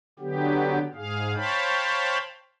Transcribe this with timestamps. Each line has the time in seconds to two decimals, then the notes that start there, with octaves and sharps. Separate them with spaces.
0.19 D3 F#3 B3 G4
0.95 G#2 G#4 F5
1.35 C5 C#5 F5 G5 A5 B5